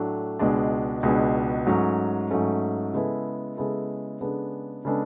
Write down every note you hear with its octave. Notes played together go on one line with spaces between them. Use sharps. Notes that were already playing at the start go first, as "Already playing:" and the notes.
Already playing: A2 F#3 A3 D4
C#2 B2 G#3 D4
C#2 B2 G#3 D4
G#2 F#3 A3 C#4
G#2 F#3 A3 C#4
C#3 G#3 B3 E4 A4
C#3 G#3 B3 E4 A4
C#3 G#3 B3 D4 A4
C#3 G#3 B3 D4 A4